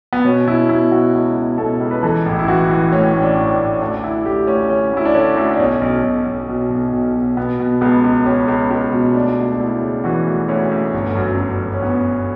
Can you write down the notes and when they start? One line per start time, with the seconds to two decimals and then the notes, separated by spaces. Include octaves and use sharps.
0.13 B3
0.24 B2 C#4
0.47 B2 E4
0.69 B2 E4
0.92 B2 F#4
1.14 C#2 F#4
1.36 B2
1.58 B2 A4
1.80 C#2
1.91 B4
2.03 E3 A4
2.26 A1
2.39 E4
2.47 E3 F#4
2.69 E3
2.92 A2 C#4
3.14 A2
3.22 D4
3.37 A1
3.52 D4
3.59 A1
3.81 D2 D4
4.03 D3 E4
4.26 D2 G4
4.47 D2 C#4
4.70 D3 C#4
4.93 D2 E4
5.05 D4
5.15 D3 C#4
5.36 D2
5.53 D4
5.59 B1 C#4
5.81 B1
6.04 B1
6.26 B1
6.48 B2
6.70 B1
6.93 B1
7.15 B2
7.37 B2 B3
7.60 B2
7.81 C#2 B3
8.04 C#2
8.26 C#2 C#4
8.48 C#2
8.71 C#2
8.92 B2
9.15 D2 D4
9.37 D2
9.52 D4
9.59 D2 E4
9.82 C#3
10.04 E3 F#4
10.27 D2
10.49 D2 C#4
10.71 D2
10.94 G1
11.15 F#2
11.38 F#2
11.60 F#2
11.74 C#4
11.82 G1 B3
12.05 G1